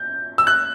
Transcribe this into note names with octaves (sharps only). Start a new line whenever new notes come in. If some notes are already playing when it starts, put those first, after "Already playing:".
Already playing: G6
E6
F#6